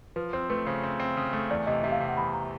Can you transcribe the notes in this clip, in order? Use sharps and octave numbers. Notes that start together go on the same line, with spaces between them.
F3 B4
C4 C5
A3 B4
C#3 C5
C4
C4
C#3
A3
E2 D5
C3 D#5
C3 E5
F5
C3
F#5
E2 B5
A#5